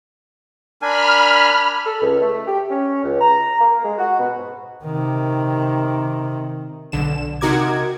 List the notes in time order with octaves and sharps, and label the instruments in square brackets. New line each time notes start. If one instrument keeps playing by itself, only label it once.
[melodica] D4 A#4 G#5 [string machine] B5 F6
[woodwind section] A4
C#2
A3
G4
C#4
C#2
A#5
A#3
G#3
F#4
B2
G#2
[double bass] C3 D#3
[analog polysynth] B1 D3 E7
C3 D#4 F#4 A#4 D6 G#6